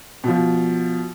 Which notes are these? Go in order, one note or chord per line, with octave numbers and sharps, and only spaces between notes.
B2 F3